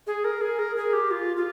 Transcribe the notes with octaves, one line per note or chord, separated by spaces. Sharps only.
G#4
A#4
G#4
A#4
G#4
G4
F4
F4